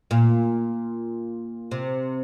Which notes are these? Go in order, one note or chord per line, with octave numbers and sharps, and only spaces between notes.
A#2
C3